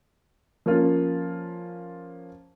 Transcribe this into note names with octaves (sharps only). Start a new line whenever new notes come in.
F3 A#3 C#4 F4